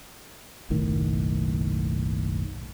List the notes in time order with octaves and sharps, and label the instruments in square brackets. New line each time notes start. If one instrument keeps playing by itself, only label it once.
[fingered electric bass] F#1 B1 A2 D#3